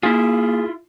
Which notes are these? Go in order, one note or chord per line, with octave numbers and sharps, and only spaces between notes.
A#3 E4 F4 G#4